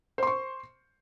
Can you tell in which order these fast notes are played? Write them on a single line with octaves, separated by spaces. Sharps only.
C5 C6 C#6